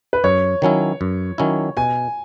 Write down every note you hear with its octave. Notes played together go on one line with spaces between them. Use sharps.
B4
F#2 C#5
D#3 F#3 C#4 E4
F#2
D#3 F#3 C#4 E4
B2 G#5